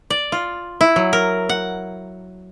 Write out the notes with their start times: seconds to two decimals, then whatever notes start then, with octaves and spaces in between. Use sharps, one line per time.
0.10 D5
0.32 F4
0.81 E4
0.96 F#3
1.13 A#4
1.49 F#5